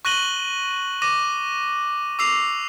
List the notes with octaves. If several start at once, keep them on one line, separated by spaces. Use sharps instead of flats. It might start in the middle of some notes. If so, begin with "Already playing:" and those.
C#6 F#6 A#6 D#7 F#7 G7
D6 A#6 D#7
D6 E6 C7 F7